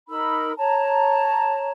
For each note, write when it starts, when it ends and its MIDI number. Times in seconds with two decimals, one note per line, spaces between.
0.09 0.51 63
0.09 0.51 70
0.09 0.51 83
0.09 0.51 88
0.58 1.72 73
0.58 1.72 81
0.58 1.72 82